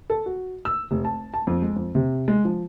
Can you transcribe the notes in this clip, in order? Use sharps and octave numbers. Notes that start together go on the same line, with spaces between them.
A4
F#4
E6
F1
A5
A5
F2
G#3
F2
C3
G#3
F3